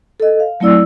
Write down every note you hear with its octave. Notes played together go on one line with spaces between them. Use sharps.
A4 D#5
F5
F#3 A3 C4 E4 D5 E6